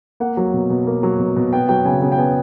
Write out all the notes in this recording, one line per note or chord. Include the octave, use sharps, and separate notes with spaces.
A#3 F#5
F#3
B2
B2
A#3
F#3
B2
B2
B3 G5
F#3 G5
C#3 G#5
C#3
G5
B3 G#5